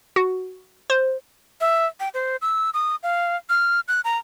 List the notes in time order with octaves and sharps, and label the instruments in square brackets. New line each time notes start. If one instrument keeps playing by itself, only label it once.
[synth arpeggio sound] F#4
C5
[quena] E5
G5
C5
E6
D#6
F5
F6
F#6
A#5